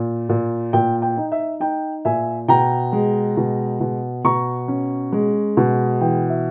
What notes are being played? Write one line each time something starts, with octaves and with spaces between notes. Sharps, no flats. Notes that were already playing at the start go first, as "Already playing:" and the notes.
Already playing: A#2
A#2
A#2 G5
G5
D#4
E5
D#4 G5
A#2 E5 G#5
B2 G5 A#5
G#3
B2
B2
B2 A#5 C#6
C#4
G#3
B2
E3 G5
E5